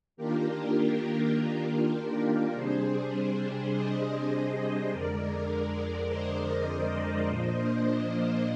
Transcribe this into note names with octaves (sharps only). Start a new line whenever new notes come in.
D#3 A#3 D4 F4 G4 A#4
G4 A#4
C3 G3 D4 G#4 C5
C5 D#5
F2 D3 G#3 A#4 D5
C5 D#5
A#2 F3 A#3 D4